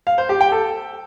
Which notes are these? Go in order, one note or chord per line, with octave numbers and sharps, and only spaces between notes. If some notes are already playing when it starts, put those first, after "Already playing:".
F5
C5
G4
G5
A4